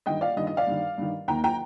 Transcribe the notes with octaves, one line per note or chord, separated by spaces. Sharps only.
G2 D#3 D#5 G5
D5 F5
G2 D#3 D#5
D#5
D5 F5
G2 D#3
G2 D#3
D#2 D#3 G5 A#5
G5 A#5